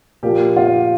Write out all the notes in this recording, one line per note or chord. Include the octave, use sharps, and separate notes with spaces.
A#2 F3 A#3 G4
F4